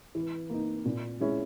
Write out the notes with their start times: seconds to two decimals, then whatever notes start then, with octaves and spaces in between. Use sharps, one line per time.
0.15 E3
0.50 A#3 D#4
0.85 A#2
1.20 G#3 C#4 E4